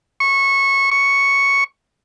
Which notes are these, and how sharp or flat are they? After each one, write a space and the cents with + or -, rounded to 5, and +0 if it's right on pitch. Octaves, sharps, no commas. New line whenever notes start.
C#6 -15
C#6 +0